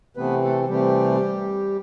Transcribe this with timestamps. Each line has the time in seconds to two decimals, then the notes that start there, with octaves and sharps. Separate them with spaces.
0.16 C3 E3 A3 B3 C4 B4
0.43 A3 A4
0.68 C3 E3 G3 A3 C4 G4